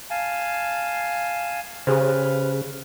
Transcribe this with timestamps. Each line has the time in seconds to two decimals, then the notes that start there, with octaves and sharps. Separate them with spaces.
0.10 F5 G#5 A5
1.87 C#3 G4 G#4 B4 C5 F6